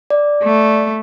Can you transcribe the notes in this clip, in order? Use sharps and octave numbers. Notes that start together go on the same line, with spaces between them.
D5
A3